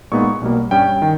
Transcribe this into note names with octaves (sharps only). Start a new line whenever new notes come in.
A#2 G#3 B3 D#4 C#6
B1 B2 G3 A#3
G2 G3 C#4 G5
D#3